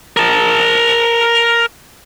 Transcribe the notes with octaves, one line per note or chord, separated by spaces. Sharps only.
A#4 A5